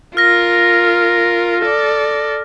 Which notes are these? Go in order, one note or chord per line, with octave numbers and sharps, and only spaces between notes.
F4 A#4 F6 A#6
A4 D5